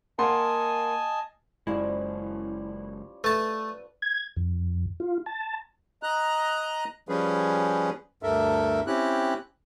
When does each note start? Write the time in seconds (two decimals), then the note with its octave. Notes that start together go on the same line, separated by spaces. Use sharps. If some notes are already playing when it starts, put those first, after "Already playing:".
0.19 A#3 D#5 F#5 G#5 A5 C6
1.67 F#1 F#2 F3 G3 G#3 C#4 E4
3.24 A3 B4 A5
4.02 G#6
4.37 F2
5.00 F4
5.26 A5
6.03 D#5 A#5 F#6
7.09 F3 G3 C#4 G#4 B4
8.23 D2 G2 A4 A#4 E5
8.87 C4 C#4 E4 G4 F#6